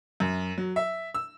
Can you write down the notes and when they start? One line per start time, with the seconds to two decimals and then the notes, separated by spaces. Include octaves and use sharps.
0.20 F#2
0.58 F#3
0.76 E5
1.14 E6